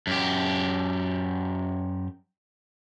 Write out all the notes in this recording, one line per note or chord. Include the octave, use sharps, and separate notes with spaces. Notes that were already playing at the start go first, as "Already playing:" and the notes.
F#2 G4